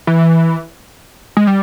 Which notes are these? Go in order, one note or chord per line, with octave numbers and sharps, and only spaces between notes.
E3
G#3
G3